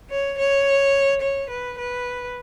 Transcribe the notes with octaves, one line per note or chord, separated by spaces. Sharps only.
C#5
C#5
C#5
B4
B4